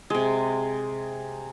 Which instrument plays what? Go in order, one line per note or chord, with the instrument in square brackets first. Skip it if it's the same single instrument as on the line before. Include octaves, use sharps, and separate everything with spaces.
[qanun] C3 G#3 [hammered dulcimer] G#4